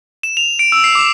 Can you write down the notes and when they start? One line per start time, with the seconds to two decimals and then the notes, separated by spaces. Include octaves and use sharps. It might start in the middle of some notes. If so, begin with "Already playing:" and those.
0.23 E7
0.37 F7
0.59 D7
0.72 E6
0.84 C7
0.95 D6